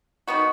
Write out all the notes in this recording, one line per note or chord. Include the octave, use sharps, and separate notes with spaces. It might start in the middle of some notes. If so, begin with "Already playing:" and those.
D#3 B3 F#4